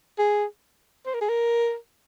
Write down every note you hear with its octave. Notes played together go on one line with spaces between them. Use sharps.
G#4
C5
A#4
G#4
A#4